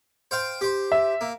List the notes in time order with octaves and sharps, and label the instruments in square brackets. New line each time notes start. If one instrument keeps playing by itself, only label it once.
[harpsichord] C5 F5 G5
G4 C5
[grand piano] E5
[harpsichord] A#3